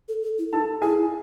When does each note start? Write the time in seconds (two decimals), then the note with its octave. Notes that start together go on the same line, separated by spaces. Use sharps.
0.08 A4
0.23 A4
0.38 E4
0.52 D#4 A4 A5
0.82 E4 G#4 G#5